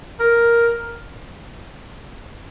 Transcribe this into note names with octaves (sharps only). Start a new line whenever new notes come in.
A#4